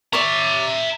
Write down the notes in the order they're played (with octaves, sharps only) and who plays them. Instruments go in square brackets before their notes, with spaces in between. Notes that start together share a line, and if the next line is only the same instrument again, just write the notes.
[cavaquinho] C#5 D5 [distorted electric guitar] E5 A#5